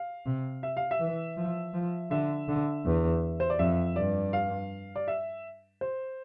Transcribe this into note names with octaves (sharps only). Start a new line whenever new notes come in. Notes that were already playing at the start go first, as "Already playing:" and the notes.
Already playing: F5
C3
E5
F5
E5
E3
F3
F3
D3 E5
D3
E2
C5
D5
F2 E5
G2 D5
F5
D5
E5
C5